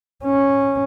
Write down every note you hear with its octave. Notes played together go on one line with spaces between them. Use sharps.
C#4